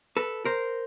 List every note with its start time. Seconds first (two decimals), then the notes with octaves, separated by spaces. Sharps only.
0.17 A4 B4
0.45 A#4 C5